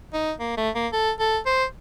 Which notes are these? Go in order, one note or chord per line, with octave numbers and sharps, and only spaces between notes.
D#4
A#3
A3
A#3
A4
A4
C5